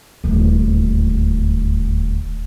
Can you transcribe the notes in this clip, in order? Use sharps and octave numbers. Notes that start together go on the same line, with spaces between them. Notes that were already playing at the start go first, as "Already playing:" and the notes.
D#1 D2